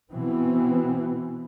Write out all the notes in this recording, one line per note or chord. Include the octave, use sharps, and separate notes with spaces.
B2 E3 B3 C4